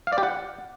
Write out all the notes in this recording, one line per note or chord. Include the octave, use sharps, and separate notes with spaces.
F5
D5
G4
F#5